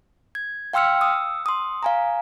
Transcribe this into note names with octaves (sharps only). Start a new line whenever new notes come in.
G#6
F5 G5 C6 E6 F6 C#7
D#6 E6
C6 D#6
F5 G#5 A#5